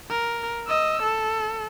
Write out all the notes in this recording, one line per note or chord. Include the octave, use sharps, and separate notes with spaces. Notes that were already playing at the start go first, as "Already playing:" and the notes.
A#4
D#5 E6
A4